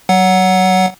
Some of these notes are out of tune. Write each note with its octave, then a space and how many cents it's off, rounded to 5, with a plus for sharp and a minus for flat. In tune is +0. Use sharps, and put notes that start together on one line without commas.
F#3 +25 F#5 -5